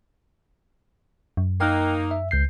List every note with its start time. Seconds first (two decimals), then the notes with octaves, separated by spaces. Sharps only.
1.37 F#2
1.61 A#3 D#4 G5 F6 F#6
2.11 E5
2.31 C#2 G6 C7